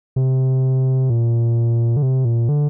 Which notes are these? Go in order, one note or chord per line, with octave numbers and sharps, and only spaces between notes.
C3
A#2
D3
C3
A#2
D3